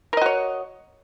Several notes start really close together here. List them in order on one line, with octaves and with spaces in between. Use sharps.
A#4 D#5 F#4 C#5